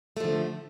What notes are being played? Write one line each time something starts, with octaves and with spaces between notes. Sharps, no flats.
D3 F3 A3